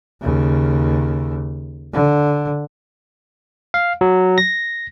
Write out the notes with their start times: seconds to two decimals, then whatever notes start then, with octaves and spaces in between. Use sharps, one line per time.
0.22 D#2 C#3
1.93 D3
3.74 F5
4.01 F#3
4.38 A#6